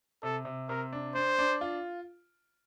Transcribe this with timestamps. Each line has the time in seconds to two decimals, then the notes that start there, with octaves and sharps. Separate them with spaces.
0.23 C3 A4
0.45 C3
0.69 C3 A#4
0.93 D4
1.15 D4 C5
1.39 D4
1.61 F4